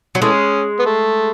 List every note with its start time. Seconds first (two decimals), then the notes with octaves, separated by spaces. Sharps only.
0.15 F#3
0.22 E3 G#3 A3 C#4
0.80 B3
0.85 A3